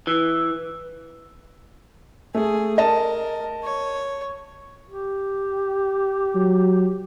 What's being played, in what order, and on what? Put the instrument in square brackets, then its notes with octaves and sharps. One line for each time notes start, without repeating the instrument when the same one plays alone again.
[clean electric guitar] E3
[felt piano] A3 [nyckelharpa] G#4
[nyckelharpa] A#4 [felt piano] D#5 A5
[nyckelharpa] C#5
[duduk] G4
[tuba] F#3